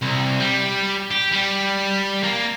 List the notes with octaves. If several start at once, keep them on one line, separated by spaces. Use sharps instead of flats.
C2
G3
G4
G3
A#3